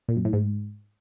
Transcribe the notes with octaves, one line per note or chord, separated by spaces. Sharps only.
A#2
F#2
A2
G#2